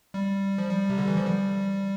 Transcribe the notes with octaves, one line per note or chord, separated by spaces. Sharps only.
G3
F3
G3
C3
D3
E3
F3
G3